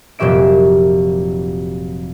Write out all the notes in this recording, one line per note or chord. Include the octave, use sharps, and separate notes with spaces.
F1 A#2 F#3 G4 E5 D7